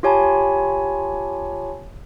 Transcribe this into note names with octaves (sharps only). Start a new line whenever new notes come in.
F4 G4 C#5 G#5 A5 B5